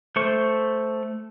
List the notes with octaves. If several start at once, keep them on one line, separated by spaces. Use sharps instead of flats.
A3 C5 C#6